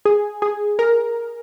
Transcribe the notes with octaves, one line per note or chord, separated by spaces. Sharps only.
G#4
G#4
A#4